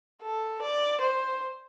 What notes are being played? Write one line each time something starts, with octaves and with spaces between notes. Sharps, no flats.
A4
D5
C5